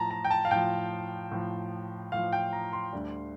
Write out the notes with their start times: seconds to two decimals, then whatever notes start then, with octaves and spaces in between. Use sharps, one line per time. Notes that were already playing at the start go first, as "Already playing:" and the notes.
Already playing: A2 F3 A5 A#5
0.11 A#5
0.25 G5
0.31 A5
0.45 F5
0.51 A2 F3 G5
1.31 A2 F3
2.12 A2 F3 F5
2.33 G5
2.53 A#5
2.73 C6
2.93 D2 D3 G3